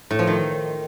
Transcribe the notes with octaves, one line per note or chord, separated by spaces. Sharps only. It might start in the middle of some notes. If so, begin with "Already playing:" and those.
A2
F3
D#3